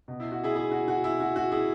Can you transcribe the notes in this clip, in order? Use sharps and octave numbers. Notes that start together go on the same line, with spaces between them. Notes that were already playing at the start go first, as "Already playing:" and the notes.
B2
E4
F#4
E4 G#4
E4 G#4
F#4
F#4
E4
F#4
F#4
E4 G#4